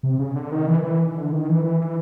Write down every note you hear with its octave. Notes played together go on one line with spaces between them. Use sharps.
C3
C#3
D3
D#3
E3
E3
D3
D#3
E3
E3
E3